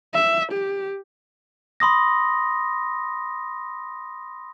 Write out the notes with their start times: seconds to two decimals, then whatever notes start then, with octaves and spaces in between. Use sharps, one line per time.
0.14 E5
0.52 G4
1.80 B5 C6 D#6 A#6